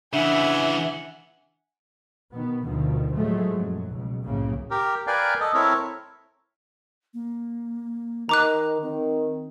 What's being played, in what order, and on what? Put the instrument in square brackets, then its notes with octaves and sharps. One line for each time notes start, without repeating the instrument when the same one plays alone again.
[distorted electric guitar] C#3 E3 [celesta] D4 [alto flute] E5 [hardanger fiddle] F#5 G#5
[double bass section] B2 D#3 B3
D2 B2 D3 D#3 F3
A2 F3 F#3 G#3 A3
F#2 A#2 F#3
C#2 B2
C2 F#2 A2 C#3 A#3
[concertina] G4 A#4
A#4 B4 D5 F5 G5 G#5
A4 D#5
C4 E4 A4 A#4 C#5
[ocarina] A#3
[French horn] D#3 [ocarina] D#5 [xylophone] A#5 D6 F#6
[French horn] D#3 [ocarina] C4